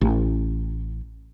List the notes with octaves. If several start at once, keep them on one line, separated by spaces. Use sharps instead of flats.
A1